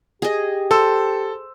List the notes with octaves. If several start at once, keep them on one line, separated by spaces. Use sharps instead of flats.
G4 G#4 D#5
A4 C5 E6